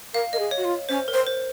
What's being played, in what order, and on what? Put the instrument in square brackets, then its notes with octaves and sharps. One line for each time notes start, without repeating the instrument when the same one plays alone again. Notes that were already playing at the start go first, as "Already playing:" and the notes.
[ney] A#4 [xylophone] F5
[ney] A#4 [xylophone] D#5
[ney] G#4
[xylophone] C#5
[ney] F#4
F4
[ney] C#4 [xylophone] C5
[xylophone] A#4
[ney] C5
[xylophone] C5